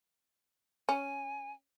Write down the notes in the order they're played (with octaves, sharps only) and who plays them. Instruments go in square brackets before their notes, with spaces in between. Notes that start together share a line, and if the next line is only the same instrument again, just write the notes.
[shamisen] C#4 [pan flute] G#5